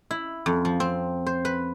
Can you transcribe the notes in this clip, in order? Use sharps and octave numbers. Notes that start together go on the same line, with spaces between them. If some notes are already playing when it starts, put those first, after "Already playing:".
E4
F2
F3
C4
C5
B4